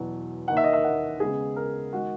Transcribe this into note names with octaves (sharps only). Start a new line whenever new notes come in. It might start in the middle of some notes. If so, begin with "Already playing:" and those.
Already playing: E2 B2 F#3
D#2 D#3 A#3 D#4 F#5
E5
D#5
E5
F#5
C#3 G#3 B3 G#4
A#4
D#3 G#3 F#4